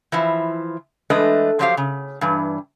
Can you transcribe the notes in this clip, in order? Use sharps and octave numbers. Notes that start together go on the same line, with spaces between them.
E3 F3 E4
E3 G#3 A3 D4 B4 D#5
F3 F#3 G4 C5 D#5 F5
C#3
G2 E3